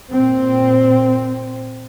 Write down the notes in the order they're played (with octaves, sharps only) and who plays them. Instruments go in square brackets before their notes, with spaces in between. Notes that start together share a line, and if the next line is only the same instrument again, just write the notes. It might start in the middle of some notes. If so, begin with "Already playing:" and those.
[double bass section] A#2 C4